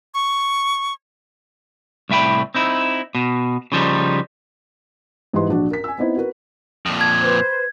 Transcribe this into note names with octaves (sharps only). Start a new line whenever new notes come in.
C#6
C2 A2 E5 G5 B5
C4 D#4 E4
B2
C#3 F3 G3 D#4
G#2 E3 G3 B4 D#5 C6
A#1 D4 F#4
A#4 B6
G#5 E6
B3 C4 D#4 E4 C5
F#4 A#4 B4
F2 A#2 A5
G#6
B4 C5